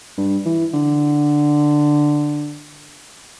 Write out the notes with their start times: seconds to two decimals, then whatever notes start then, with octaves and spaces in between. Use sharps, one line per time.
0.18 G2
0.45 E3
0.74 D3